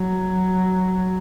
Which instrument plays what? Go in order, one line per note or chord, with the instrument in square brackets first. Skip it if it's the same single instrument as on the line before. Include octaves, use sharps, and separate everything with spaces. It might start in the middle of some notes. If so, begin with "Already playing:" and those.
Already playing: [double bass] F#3